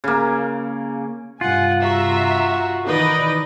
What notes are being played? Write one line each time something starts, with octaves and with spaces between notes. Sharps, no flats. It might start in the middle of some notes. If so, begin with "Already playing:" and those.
C#3 A#3
G2 C3 F4 F#5 G#5
F#4 E5 A#5
D#3 E3 D#4 B4 D5 D#5